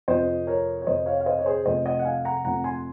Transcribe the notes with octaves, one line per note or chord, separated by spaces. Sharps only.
F2 C3 F3 C5 D#5
A#4 C#5
C#5
F2 C3 F3 C5 D#5
C#5 F5
F5
C5 D#5
C#5
G#4 C5
F1 F2 C3 C5 D#5
D#5 F#5
F#5
F5 G#5
F#5 A#5
F1 F2 C3 F#5 A#5
G#5 C6